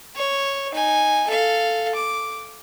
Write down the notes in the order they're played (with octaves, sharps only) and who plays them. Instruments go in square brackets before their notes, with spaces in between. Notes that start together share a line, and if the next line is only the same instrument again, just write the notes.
[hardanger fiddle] C#5
D#4 G#5
A4 F5
D6